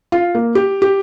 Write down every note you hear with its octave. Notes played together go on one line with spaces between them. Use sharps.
F4
A#3
G4
G4